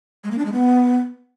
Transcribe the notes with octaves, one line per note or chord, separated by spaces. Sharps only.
G#3
A#3
D4
G#3
B3